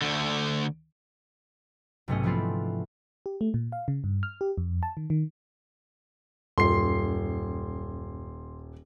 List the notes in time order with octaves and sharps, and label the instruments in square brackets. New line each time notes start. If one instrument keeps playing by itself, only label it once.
[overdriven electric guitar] D2 D3
[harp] B1 G#2 C3 A3 C#4 D#5
E3 F3 B3 C4 D4 F4
[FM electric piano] G4
A3
A#2
F5
C#3
G2
F6
G4
F2
A5
D#3
D#3
[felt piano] D#1 [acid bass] F#2 [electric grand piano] C6 C7